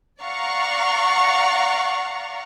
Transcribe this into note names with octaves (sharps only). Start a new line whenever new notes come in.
D5 F5 F#5 A#5 C#6